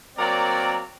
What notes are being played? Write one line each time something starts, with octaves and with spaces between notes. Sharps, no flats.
F#3 A#3 C4 A#4 D5